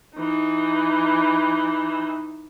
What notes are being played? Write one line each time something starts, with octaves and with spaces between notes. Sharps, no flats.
E3 D#4